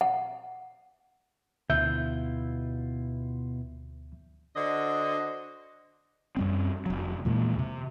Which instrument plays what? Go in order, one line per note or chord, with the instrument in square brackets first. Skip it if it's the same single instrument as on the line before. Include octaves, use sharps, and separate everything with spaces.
[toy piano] F#5
[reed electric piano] D2 E5 G6 [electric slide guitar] B2 E4 F4
[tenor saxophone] D3 [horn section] F#4 C5 D#5
[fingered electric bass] F#2 G3 C4
F1 F#3
E2 A#2 G#3 A#3
C3